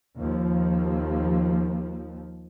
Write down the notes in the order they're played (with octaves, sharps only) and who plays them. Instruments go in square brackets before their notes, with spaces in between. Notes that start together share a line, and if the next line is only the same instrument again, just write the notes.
[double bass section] D#2 F3